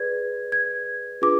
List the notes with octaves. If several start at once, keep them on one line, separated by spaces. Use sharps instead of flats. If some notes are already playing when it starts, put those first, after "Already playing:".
Already playing: G#4 B4 D5 G#6
G#6
D4 F4 G#4 B4 D6